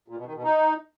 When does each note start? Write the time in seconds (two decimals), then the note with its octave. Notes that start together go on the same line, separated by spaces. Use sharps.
0.08 A#2
0.17 B2
0.26 D#3
0.35 B2
0.44 D#4